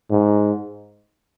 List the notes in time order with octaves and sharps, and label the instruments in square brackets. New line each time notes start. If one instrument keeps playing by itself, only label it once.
[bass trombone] G#2